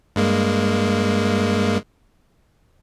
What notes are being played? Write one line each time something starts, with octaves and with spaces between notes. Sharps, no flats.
G2 G#3 A#3